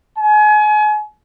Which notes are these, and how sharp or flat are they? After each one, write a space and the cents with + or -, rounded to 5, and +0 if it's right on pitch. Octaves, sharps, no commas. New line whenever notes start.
G#5 +35